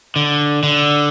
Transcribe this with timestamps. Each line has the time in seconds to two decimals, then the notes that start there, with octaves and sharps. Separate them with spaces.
0.16 D3
0.63 D3